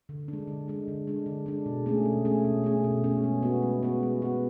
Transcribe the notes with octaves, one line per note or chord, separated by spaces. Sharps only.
D3
G#3 D4
D3
G#3 D4
D3
G#3 D4
D3
G#3 D4
B2
A3 C#4 G#4
B2
A3 C#4 G#4
B2
A3 C#4 G#4
B2
A3 C#4 G#4
G#3
B3 F#4
G#3
B3 F#4
G#3
B3 F#4